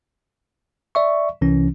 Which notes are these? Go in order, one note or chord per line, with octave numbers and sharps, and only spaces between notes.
D5 E5 C#6
C2 C3 E3 C#4